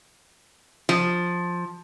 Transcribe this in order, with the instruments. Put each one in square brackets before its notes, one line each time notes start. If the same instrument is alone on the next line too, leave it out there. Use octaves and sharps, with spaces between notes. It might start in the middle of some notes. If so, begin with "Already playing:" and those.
[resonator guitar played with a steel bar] F3